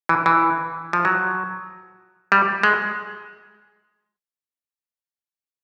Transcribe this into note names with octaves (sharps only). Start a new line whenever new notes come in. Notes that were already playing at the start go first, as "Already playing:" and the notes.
E3
E3
F3
F#3
G3
G#3